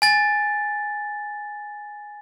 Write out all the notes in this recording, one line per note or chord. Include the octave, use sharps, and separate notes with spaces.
G#5 A6